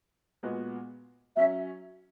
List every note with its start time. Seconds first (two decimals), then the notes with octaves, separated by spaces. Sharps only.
0.43 A#2 G#3 B3 F#4
1.35 F#3 C#4 E5